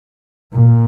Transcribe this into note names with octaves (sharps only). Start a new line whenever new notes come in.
A#2